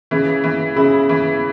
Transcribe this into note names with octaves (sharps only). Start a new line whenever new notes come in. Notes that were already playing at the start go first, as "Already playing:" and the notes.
C#3 E3
E3
C#3 E4
E3